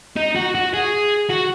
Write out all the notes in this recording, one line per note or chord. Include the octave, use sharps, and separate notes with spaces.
D#4
F#4
F#4
G#4
F#4